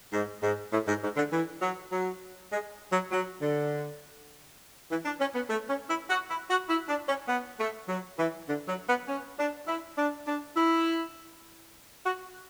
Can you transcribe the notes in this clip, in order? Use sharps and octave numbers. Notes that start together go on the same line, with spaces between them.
G#2
G#2
A2
G#2
G#2
D3
E3
F#3
F#3
G#3
F#3
F#3
D3
E3
D4
C#4
B3
A3
C#4
E4
F#4
E4
F#4
E4
D4
C#4
B3
A3
F#3
E3
D3
F#3
B3
C#4
D4
E4
D4
D4
E4
F#4